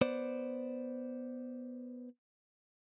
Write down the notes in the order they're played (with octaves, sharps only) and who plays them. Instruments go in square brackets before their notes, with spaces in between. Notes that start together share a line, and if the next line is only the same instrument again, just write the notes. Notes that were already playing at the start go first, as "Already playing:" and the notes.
[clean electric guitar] B3 C5 D5